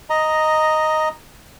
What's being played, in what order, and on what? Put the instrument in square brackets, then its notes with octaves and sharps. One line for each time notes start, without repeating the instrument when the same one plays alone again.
[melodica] D#5 A#5